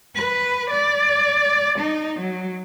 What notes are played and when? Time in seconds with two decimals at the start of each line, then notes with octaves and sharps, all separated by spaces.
0.15 B4
0.70 D5
1.78 D#4
2.19 F#3